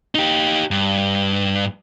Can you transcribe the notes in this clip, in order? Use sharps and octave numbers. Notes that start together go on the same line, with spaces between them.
D#4 G4
G2